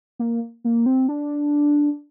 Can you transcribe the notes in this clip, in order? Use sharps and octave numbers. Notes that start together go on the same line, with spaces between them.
A#3
A#3
C4
D4